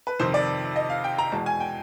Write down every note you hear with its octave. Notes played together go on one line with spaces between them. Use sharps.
B4
F2 C3 D#3 C5
D5
D#5
F5
G5
A#5
E2 B2 G#3 A5
G#5
G5